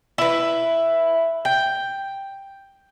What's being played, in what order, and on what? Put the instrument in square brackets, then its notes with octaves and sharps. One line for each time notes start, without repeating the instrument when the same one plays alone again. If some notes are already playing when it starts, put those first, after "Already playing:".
[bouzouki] E4 B4
G5